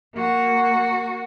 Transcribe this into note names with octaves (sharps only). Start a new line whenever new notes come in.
A#3 F#4